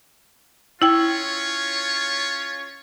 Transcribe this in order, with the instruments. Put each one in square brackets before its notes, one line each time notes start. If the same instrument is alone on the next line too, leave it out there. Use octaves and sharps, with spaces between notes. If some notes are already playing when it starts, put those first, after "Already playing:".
[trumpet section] C#4 F4 C#5 [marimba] E4 G5